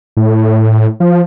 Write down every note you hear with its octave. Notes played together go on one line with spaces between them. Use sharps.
A2
F3